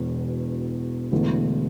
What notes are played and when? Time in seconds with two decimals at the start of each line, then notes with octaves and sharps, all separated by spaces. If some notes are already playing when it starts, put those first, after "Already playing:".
Already playing: E1 E2 B2
1.11 E1 E2 D3 A3